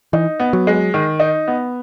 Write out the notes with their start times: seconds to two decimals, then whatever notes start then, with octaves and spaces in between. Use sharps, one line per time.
0.13 E3 D#4
0.40 B3
0.53 F#3
0.67 G#3
0.94 D#3
1.20 D#4
1.48 B3